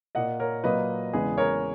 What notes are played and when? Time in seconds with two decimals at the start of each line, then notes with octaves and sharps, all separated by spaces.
0.15 A#2 A#3 D#5 F#5
0.40 A#4 C#5
0.64 A#2 F#3 A#3 B4 D#5
1.13 E2 C#3 G#3 B3 G#4 B4
1.38 A#4 C#5